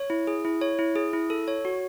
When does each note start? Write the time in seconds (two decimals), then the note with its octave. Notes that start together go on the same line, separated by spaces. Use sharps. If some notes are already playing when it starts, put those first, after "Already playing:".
Already playing: C#5
0.10 E4
0.27 G#4
0.45 E4
0.61 C#5
0.79 E4
0.96 G#4
1.13 E4
1.30 A4
1.48 C#5
1.65 F#4